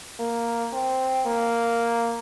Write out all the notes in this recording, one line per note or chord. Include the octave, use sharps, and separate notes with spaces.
A#3
C4
A#3